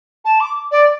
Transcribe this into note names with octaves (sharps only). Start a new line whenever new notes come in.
A5
D6
D5